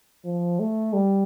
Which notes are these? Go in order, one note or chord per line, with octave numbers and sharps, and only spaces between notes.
F3
A3
G3